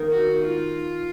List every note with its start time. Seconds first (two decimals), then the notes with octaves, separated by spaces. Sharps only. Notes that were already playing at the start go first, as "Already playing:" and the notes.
Already playing: D#3 A#3 D#4
0.11 F#4
0.43 F4